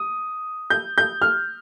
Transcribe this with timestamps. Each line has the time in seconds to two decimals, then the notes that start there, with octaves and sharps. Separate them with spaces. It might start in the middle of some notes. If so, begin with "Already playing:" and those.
Already playing: D#6
0.70 G6
0.98 G6
1.22 F6